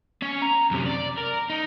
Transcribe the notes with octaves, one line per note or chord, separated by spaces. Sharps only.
C#4 C#5
A#5
F#2 C3
D5
A#4
D#4